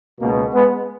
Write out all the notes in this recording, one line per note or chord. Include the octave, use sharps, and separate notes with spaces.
C#2 B2 A#3
G#3 B3